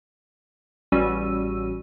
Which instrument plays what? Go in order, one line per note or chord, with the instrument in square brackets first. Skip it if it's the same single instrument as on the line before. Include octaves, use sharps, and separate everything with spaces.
[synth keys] A1 G3 C#4 F#4 E6 D#7